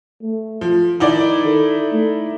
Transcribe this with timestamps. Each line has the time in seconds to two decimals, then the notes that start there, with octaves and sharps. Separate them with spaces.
0.23 A3
0.61 F3
1.00 D#3 D#4 E4 D5
1.46 A4
1.92 A3